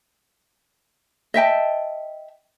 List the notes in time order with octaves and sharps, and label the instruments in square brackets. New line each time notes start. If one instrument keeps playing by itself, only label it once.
[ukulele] D#5 E5 G5 A5